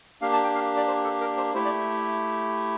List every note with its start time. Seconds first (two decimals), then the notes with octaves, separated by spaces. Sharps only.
0.21 A#3 D4 G4 F5
0.33 A5
0.44 G5
0.55 F5
0.77 D5
0.88 C5
1.05 A4
1.20 A#4
1.37 C5
1.54 A3 E4 G4 C5
1.65 D5